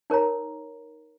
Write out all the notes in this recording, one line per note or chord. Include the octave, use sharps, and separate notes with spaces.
D#4 A#4 C#5 A#5